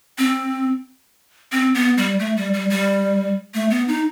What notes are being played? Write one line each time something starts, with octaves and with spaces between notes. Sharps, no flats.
C4
C4
B3
G3
A3
G3
G3
G3
A3
B3
D#4